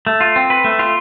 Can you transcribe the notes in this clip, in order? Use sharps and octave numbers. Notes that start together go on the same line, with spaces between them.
A3
F4
C4
B4
A3
F4